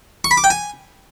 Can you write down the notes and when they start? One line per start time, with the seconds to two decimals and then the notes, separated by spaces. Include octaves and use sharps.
0.24 C#6
0.31 B5
0.37 D6
0.44 G5
0.50 G#5